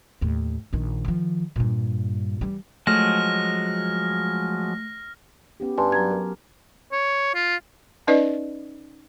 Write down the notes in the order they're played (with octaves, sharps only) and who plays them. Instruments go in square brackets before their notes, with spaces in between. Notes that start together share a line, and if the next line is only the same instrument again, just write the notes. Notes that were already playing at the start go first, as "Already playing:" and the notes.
[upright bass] D#2 A2
A#1 D#3
D#3 F3
G2 A#2
E3 G3
[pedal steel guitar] F3 F#3 G#3 [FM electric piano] A3 [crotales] F6 A#6
[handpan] B3 C#4 G4
[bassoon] G2 [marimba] G#5 A5 C6
[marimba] F#3 A#5 G#6 [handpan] F#4
[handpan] A#4
[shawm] C#5
F4
[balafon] C#4 D#4 B4 D5 D#5